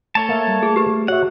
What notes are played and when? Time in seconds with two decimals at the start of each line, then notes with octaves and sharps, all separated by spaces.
0.15 A3 A4 C#5 A5
0.29 A#3 E5
0.47 G3
0.63 A3 G#4
0.76 G4 B4
1.08 F#4 C#5 E5 F#5